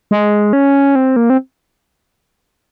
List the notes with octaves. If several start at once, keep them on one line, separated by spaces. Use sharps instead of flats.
G#3
C#4
C4
A#3
C4